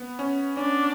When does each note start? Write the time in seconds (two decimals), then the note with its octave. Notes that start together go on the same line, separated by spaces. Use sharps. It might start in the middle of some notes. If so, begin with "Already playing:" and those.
Already playing: B3
0.19 C#4
0.57 C#4 D4